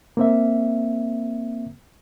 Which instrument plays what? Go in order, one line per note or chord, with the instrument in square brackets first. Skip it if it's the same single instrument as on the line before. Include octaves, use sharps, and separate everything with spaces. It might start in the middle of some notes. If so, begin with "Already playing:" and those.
[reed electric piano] A#3 C4 E5